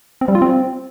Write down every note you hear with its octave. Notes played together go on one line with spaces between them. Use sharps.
C4
G3
F4
C4